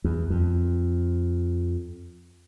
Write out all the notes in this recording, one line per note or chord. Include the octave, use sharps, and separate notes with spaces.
E2
F2